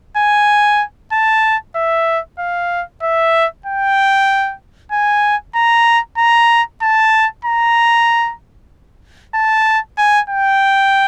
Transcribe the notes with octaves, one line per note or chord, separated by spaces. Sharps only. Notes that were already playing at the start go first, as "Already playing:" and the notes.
G#5
A5
E5
F5
E5
G5
G#5
A#5
A#5
A5
A#5
A5
G#5
G5